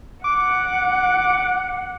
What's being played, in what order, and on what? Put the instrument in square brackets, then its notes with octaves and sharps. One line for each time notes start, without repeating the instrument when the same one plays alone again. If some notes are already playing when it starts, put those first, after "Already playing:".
[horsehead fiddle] F#5 [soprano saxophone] D6